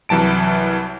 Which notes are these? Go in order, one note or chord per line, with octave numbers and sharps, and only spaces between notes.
C2 E3 F#3 A5 D7